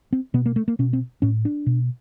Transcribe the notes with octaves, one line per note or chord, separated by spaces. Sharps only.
C4
B2 B3
A#3
A3
A#3
B2 C#4
C4
A2 C#4
D4
B2